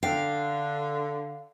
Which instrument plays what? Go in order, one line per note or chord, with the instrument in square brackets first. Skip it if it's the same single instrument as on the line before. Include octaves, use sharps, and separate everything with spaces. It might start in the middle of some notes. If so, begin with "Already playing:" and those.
[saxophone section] D3 [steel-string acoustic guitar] F5 [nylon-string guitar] G5